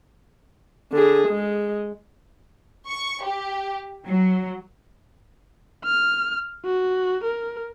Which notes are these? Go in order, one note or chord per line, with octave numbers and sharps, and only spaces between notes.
D3 G#4
G#3
C#6
G4
F#3
F6
F#4
A#4